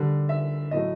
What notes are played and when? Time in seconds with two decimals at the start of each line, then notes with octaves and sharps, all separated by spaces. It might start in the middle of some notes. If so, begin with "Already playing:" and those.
Already playing: D3 G3
0.29 E5
0.71 A2 F#3 A3 D#5